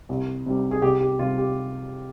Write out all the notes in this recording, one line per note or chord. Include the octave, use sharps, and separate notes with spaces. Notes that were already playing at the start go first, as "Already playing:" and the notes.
C2
C3 G3
G#4
C2 G4
G4
C3 G3 F4
G4